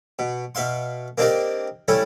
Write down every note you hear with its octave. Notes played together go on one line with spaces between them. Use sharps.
B2
B2 E5 F5 C6
A#3 C4 D4 D#4 G4 A#4
G3 A3 C#4 E4 A4